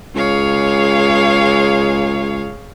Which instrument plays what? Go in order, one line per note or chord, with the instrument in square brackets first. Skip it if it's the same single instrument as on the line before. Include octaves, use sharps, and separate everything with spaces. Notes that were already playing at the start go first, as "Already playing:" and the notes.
[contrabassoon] C#2 [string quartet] G#4 C#5 F5